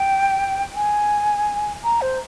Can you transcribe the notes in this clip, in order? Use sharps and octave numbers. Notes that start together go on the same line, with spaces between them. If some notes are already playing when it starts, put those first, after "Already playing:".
Already playing: G5
G#5
A#5
C5